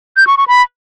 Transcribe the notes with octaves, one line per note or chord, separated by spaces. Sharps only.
G6
C#6
C#6
B5